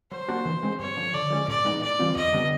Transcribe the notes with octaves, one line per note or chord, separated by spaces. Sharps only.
F#3 C5
A#3 D4 F#4
E3
G#3 C4
G2 C#5
D3 F3
D3 D5
F3 G#3 C#4
A2 D5
E3 G#3 B3 D#4
A2 D5
E3 G3 C4 F4
F2 D#5
D3 G3 B3 D4